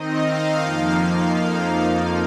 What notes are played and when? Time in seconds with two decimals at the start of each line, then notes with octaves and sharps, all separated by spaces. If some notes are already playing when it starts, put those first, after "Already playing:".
Already playing: D#3 C4 D#4 D#5
0.25 F5
0.61 F2 F3 A#3 D#4
0.98 F5